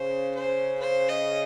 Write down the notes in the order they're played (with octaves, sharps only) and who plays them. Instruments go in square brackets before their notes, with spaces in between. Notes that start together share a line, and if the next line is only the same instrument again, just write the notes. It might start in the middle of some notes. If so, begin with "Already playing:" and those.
Already playing: [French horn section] C#3 [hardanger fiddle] C5
[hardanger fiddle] C5
C5
D#5